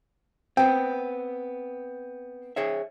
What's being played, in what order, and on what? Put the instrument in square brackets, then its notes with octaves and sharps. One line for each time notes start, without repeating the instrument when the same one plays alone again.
[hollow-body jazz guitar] B3 C4 [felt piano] G5
[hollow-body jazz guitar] G#4 C#5 E5